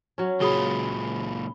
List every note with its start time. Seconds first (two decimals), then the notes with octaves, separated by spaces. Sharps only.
0.18 F#3 C#4
0.41 C#2 A#2 F#4 G#4 B5 D#6 G7